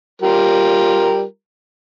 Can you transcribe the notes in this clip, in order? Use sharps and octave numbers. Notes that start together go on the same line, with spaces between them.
G3 F4 A#4